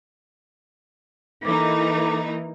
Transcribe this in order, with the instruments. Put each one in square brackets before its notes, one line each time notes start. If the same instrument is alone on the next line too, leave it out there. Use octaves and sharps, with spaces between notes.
[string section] E3 A#3 D#4 [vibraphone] A4 D6